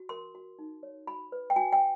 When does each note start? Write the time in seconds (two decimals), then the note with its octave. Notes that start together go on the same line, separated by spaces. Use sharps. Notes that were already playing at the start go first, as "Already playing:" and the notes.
Already playing: F#4
0.09 A#4 C6
0.35 F#4
0.59 D#4
0.83 C#5
1.07 F#4 B5
1.32 B4
1.50 G5
1.56 F#4 G#5
1.73 G5